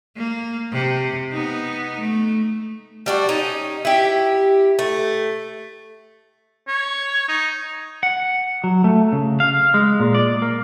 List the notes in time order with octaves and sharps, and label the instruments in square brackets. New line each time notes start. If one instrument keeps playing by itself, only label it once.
[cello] A#3
C3
B3 D#4
A3
[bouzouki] G3 D4 F#4
C#4 D#4
E4 G4
A3
[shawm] C#5
D#4
[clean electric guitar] F#5
F#3
A3
C#3
F5
G#3
A#2
D5
A#3